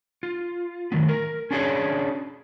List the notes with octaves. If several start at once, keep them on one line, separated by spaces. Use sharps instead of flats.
F4
A2 D#3 F#3 B3
A#4
C#4 D4 F#4 G#4 A#4 C#5